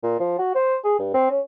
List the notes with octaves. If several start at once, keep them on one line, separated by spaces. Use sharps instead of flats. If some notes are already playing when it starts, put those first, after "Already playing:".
A#2
F3
F#4
C5
G#4
G2
C4
C#4